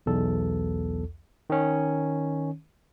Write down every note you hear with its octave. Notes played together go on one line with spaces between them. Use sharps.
B1 E2 A4
D#3 C#4